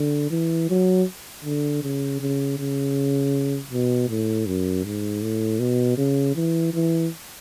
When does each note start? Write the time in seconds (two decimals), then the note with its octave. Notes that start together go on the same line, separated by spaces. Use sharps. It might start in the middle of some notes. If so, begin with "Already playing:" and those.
Already playing: D3
0.31 E3
0.69 F#3
1.45 D3
1.82 C#3
2.20 C#3
2.58 C#3
3.71 B2
4.09 A2
4.46 F#2
4.85 G#2
5.22 A2
5.59 B2
5.97 C#3
6.35 E3
6.73 E3